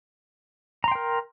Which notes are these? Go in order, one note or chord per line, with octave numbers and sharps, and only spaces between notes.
A#4 G5 A#5 C6